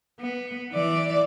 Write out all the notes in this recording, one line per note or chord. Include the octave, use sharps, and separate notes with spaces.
B3
E3 D5